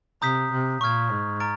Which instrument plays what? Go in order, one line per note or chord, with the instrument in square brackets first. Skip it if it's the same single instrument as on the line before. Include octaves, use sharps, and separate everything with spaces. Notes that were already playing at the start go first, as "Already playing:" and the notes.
[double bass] C3 [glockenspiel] A#5 D#6 G6 B6
[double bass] C3
[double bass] A#2 [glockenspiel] C#6 F6 G#6
[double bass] G#2
[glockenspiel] A#5 F6 A6 D7